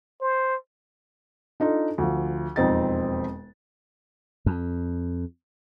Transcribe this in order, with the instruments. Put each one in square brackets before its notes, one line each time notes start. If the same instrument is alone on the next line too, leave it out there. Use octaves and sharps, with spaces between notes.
[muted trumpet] C5
[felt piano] D4 D#4 F4 A4
D2 F3
E1 F2 C4 D#4 A6
[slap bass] F2